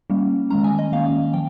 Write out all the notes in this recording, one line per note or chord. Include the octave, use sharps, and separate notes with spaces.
G3 A#3 C#4
D#3 G#3 C#4 A#5
G#5
D#5
D#3 A#3 C#4 F5
F3 G5